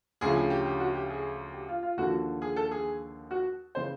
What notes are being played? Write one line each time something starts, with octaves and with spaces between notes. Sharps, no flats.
D2 C#3 F3 G#4
G#4
G4
G4
F#4
G4
G#4
G4
F4
F4
D#2 D3 F3 F#4
G#4
A4
G#4
F#4
C#3 E3 C5